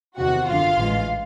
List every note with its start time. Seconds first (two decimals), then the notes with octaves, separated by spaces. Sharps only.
0.18 E2 C3 D#3 F#4 F#5
0.47 G1 F#2 D3 F4 F5
0.77 A1 G#2 E3